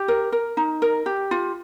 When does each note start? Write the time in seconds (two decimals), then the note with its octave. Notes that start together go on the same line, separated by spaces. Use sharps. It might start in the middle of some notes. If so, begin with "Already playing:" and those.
Already playing: G4
0.08 A#4
0.32 A#4
0.57 D#4
0.82 A#4
1.06 G4
1.31 F4